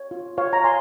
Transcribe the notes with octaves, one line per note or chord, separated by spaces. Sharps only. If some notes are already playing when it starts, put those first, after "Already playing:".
Already playing: C#5
F4
F4 C#5 F5
A#5
C#5 G#5 C6